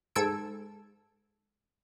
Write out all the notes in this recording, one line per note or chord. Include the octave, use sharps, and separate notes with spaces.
G#2 A4 E6 G#6 D7